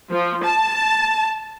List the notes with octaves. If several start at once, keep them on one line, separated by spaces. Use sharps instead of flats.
F3
A5